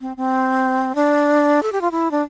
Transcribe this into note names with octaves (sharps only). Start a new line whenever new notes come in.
C4
C4
D4
A4
G4
F4
E4
D4